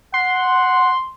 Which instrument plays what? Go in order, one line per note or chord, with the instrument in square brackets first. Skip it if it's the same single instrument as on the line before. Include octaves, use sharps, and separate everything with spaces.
[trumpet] F#5 [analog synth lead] C6